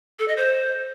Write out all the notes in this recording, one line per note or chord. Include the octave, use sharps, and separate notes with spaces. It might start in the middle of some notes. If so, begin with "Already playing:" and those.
A4
D#5
C5